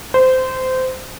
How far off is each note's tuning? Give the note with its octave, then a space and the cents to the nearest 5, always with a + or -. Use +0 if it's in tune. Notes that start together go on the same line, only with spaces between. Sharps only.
C5 -20